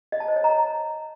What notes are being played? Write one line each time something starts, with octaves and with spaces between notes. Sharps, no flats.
D#5
A5
C5
C#5
A#5